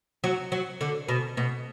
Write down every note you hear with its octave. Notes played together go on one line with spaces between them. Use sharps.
F#3
F#3
D3
B2
B2